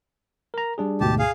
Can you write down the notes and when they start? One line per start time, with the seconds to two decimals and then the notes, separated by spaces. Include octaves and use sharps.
0.54 A#4 A#5
0.78 G3 D4 G#4
1.01 D2 G#2 B2 G4 A5
1.19 G#4 F5